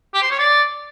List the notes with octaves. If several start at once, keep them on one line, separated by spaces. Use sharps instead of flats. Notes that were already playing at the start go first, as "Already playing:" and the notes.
G4
C5
C#5
D5